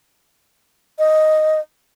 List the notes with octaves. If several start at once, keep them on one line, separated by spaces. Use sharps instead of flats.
D#5